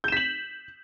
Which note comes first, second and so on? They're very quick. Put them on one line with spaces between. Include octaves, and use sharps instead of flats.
G6 E7 B6 F#7